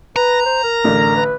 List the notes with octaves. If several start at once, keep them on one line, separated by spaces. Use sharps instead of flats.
B4 A#5
C5
A#4
A1 D3
B4